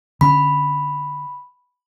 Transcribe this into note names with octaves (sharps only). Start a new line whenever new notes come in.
D3 C#4 B5